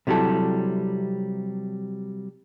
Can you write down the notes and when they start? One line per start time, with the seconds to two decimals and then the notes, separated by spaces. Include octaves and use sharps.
0.07 C3 F#3 G3 E4 A4